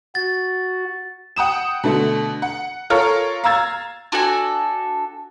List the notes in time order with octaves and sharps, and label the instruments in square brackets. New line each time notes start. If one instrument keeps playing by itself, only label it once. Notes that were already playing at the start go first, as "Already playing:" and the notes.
[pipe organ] F#4 [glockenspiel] A6
[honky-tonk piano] F#5 G5 D#6 E7
B2 D3 A3
F#5
F4 A4 A#4 C#5 F6
F5 A#5 E6 G#6 A6
[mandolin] D4 F#4 A4 G#5